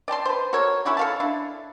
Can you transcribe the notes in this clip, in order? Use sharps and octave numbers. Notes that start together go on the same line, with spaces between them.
D5 G5 A5 C6
B4 C5
F#4 A4 A#4 C#5
C#4 E4 F#4 G4
A4 F5 A5
D4 E4